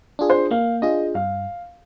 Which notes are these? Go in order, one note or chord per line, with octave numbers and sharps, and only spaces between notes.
D4 F4 G#4
C5
A#3 F5
D4 F4 G#4 D#5
G2 F5